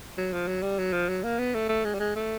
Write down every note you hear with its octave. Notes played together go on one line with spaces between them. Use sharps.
F#3
F3
F#3
G3
F#3
F3
F#3
A#3
B3
A3
A3
G#3
G3
G#3
A3